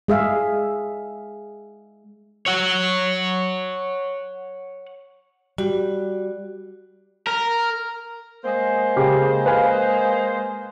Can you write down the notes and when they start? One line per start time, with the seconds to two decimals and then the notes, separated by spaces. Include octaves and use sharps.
0.08 G#3 G#4 E5 F5
2.46 C#5 F#5
5.58 G3 F#4
7.27 A#4
8.45 G#3 A#3 C5
8.96 C#3 G4
9.46 B4 F5 G#5